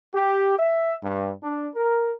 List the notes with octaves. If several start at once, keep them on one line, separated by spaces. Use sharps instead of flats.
G4
E5
G2
D4
A#4